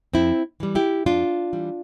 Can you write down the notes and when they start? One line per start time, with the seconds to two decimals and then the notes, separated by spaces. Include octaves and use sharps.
0.14 F2 C4 E4
0.60 E3 G3
0.75 E4 G4
1.06 F2 D4 F4
1.53 E3 G3